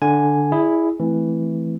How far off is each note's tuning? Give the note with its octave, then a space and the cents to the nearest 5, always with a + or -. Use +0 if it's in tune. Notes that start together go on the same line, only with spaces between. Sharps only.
D3 +0 G#5 +0
E4 +0 G#4 +0 D5 +40
E3 +0 A3 -10 C4 +0